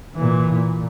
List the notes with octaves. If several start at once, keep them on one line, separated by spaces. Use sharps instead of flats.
A#2 E3
A#2